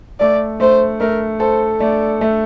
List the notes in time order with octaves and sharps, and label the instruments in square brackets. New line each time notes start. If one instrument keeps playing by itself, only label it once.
[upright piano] A3 [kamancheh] D5
[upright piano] A3 [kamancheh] C5
[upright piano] A3 [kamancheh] A#4
[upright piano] A4 [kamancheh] C5
[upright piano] A3 [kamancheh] D5
[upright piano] A3